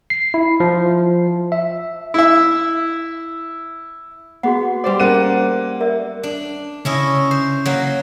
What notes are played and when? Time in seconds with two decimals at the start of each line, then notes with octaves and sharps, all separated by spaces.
0.10 C7
0.34 E4
0.60 F3
1.52 E5
2.14 E4 E5
4.43 B3 F#4 G#4 F#5
4.84 G3 C5 D5
5.00 A#3 C#4 F#5 D#7
5.81 A#4 D5 E5
6.23 D4
6.85 C#3 C#4 E4 D#5
7.31 C5
7.66 F#3 A#3